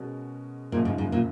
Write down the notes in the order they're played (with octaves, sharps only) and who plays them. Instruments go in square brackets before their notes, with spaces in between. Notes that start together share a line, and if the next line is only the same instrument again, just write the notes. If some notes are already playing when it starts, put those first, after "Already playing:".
Already playing: [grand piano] B2 G#3 C#4 F#4 A#4
[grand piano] F#1 F#2 F3 A#3 D#4 [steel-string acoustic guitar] A#2
[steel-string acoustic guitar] G#2
G#2
A#2